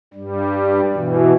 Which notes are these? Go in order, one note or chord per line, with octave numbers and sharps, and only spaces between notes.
G2 G3
B2 E3